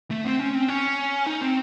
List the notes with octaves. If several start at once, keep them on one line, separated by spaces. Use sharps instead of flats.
A3
C4
C#4
C4
C#4
D#4
C4